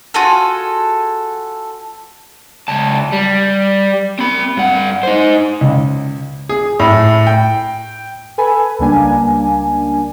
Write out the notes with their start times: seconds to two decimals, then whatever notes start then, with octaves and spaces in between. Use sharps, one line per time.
0.14 F4 F#4 G#4 A4
2.68 C#2 A5
3.12 G3
4.19 C4 B5
4.57 G2 F#5
5.03 D#4 C5
5.61 C#2
6.49 G#4
6.80 A2
7.27 G5
8.38 A4 B4 G#5 B5
8.79 C#2 G3 A#3 D4 G#5